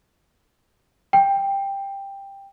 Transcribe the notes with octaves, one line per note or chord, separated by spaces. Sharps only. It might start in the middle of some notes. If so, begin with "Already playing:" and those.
G5